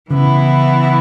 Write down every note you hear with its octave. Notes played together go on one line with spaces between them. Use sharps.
C#3 E3 B3 E4